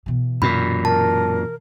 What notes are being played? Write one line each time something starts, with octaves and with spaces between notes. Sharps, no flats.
B2 E3
F#2 A#2 B5
A#4 A5